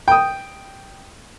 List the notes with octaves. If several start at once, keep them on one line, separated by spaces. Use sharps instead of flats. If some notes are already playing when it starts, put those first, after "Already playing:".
G5 D#6